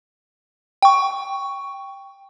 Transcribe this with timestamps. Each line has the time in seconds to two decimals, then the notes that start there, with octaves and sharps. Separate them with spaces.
0.82 G5 C#6